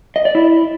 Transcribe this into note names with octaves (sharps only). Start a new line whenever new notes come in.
D#5
D5
E4